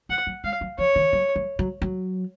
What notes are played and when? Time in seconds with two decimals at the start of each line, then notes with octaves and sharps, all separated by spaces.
0.09 F#3 F#5
0.27 F#3
0.44 G#3 F5
0.61 F#3
0.78 F3 C#5
0.96 D#3
1.13 F#3
1.36 F#3
1.59 F#3
1.82 F#3